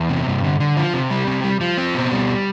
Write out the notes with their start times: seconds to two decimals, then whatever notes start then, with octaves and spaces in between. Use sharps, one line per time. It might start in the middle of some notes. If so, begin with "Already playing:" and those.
Already playing: E2
0.09 C3
0.27 G2
0.43 D3
0.60 D3
0.77 F3
0.94 C3
1.10 G3
1.27 C3
1.44 G3
1.61 F3
1.78 C4
1.94 B2
2.11 G3